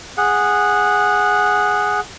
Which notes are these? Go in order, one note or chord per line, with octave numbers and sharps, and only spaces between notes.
G#4 F#5